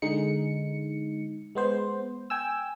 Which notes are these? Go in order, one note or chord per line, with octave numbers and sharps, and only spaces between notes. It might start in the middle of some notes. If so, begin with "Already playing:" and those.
D3 G#3 D#4 C#7
G#3 B3 C5
G5 G#5 E6